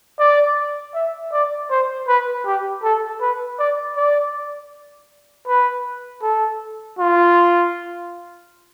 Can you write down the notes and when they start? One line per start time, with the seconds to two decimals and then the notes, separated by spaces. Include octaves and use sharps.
0.19 D5
0.94 E5
1.32 D5
1.70 C5
2.08 B4
2.45 G4
2.83 A4
3.21 B4
3.59 D5
3.96 D5
5.47 B4
6.23 A4
6.99 F4